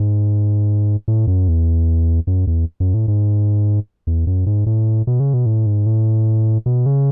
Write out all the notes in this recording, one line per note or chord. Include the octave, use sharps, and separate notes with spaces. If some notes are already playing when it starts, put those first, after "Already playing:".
Already playing: G#2
A2
F#2
E2
F#2
E2
F#2
A2
G#2
E2
F#2
G#2
A2
B2
C#3
B2
A2
G#2
A2
B2
C#3